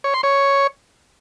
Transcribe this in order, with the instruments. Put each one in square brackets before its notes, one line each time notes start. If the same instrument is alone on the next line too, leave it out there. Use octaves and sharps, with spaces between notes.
[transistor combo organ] C#5
C6
C#5